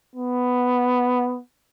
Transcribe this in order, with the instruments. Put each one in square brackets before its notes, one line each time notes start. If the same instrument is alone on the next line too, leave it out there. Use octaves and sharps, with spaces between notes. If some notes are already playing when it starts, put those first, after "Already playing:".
[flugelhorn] B3